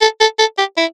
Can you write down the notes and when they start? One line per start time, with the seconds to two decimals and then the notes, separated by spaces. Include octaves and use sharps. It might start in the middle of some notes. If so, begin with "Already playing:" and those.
0.01 A4
0.21 A4
0.39 A4
0.58 G4
0.77 E4